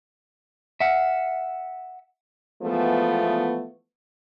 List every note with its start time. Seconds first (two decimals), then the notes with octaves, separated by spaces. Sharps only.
0.81 E5 F#5
2.63 E3 F3 G#3 A3 B3